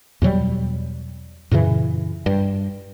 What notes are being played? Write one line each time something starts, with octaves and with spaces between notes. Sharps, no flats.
E2 B2 F#3 G3
F#2 A#2 C#3 E3
G2